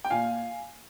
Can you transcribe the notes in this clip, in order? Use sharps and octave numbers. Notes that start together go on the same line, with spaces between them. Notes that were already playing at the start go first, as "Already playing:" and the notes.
G5
A#2 F5 G#5